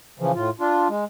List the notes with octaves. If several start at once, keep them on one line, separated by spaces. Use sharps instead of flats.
C#3 E3 F3
A2 F4
D4 F4
G#3